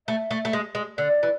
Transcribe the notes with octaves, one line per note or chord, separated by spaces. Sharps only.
A3 E5
A3
A3
G#3
G#3
D3 D5
E3